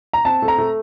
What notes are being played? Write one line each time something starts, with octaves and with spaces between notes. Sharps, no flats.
A#5
C4 A5
A3
A#5
A3